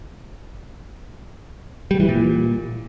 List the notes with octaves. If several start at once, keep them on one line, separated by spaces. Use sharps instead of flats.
G3
E3
A#2